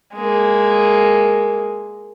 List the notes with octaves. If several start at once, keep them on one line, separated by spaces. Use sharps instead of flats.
G#3 A#3